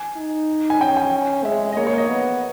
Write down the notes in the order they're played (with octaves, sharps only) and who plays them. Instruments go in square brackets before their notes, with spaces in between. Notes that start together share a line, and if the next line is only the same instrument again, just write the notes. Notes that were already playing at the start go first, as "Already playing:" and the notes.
Already playing: [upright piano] G#5
[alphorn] D#4
[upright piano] G#5
[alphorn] C#4 [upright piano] G5
[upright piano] G5
[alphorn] G#3 [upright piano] E5
[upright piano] D#5
[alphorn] A#3 [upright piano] C#5
[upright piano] C#5
D#5
[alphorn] B3